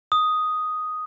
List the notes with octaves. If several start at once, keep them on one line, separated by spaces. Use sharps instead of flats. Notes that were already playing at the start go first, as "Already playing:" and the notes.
D#6